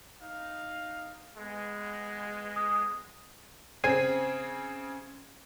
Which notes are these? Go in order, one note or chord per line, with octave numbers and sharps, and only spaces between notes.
D#4 F5
G#3 B3
D#6
C#3 C4 G#4 G#6 C7 D#7